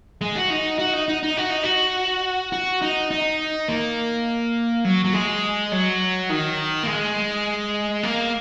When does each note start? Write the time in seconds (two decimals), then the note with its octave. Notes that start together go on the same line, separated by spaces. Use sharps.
0.21 G#3
0.36 F#4
0.50 D#4
0.79 F#4
0.94 D#4
1.08 D#4
1.23 D#4
1.37 F#4
1.50 D#4
1.63 F#4
2.52 F#4
2.82 D#4
3.11 D#4
3.68 A#3
4.85 F#3
5.05 F#3
5.13 G#3
5.72 F#3
6.30 D#3
6.83 A#3
6.87 G#3
8.03 A#3